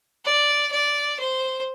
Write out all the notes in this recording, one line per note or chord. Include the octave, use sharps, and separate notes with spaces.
D5
D5
C5